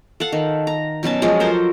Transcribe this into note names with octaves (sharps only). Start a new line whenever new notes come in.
A4 F5 F#5
D#3
A#5
B2 F#3 C#4 A5
F3 F#3 G#3 F4
A4 A#4 C5 C#5